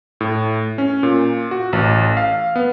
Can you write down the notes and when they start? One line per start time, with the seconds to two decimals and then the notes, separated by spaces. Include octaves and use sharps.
0.21 A2
0.78 C#4
1.03 A#2
1.51 F#4
1.73 A1
2.17 F5
2.56 B3